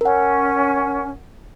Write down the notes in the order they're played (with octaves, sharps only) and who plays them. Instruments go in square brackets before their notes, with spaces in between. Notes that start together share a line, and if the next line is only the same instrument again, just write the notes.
[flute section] C#4 [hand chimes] A#4 F#5